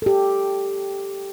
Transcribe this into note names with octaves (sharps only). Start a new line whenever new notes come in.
G4 A4